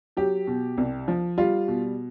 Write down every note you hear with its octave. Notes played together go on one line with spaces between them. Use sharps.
F#3 G4
B2
C2
F3
G3 F4
B2